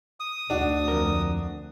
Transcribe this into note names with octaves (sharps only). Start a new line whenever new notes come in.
D#6
D2 D4 F#4
F2 A#4